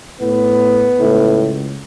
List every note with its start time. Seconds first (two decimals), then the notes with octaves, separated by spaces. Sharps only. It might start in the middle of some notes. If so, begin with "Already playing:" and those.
0.21 A2 B3
0.99 C#2 A2